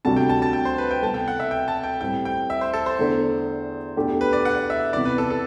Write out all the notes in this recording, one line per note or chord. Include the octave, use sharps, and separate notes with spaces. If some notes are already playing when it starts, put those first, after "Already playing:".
D2 C3 G3 D4 F#4 A5
G5
A5
A5
G5
C5
B4
G5
C2 B2 A3 A5
G5
F#5
E5
G5
A5
G5
A2 G3 C4 G5
G5
E5
C5
A4
C5
E2 D3 A3 D4
E2 B2 A3 D4 G4
B4
D5
F#5
E5
E2 C3 E3 B3 D5
B4
A4
A4